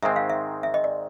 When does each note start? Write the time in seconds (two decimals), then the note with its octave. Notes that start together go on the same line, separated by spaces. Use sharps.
0.03 G#2 D#3 G#3 C4 E5
0.16 F5
0.30 E5
0.63 E5
0.74 D#5
0.84 D5